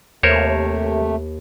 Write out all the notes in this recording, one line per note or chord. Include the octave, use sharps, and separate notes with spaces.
D#2 C3 A3 A#4 C5 C#5